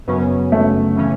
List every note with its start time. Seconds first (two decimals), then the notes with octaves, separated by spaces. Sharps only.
0.07 F#2 C#3 F#3 B3 C#4
0.52 A3
0.96 C#3 E3 C#4